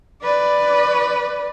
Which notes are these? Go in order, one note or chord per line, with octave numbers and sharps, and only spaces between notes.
B4 D5